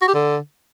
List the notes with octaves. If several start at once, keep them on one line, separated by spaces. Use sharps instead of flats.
F#4
G4
D3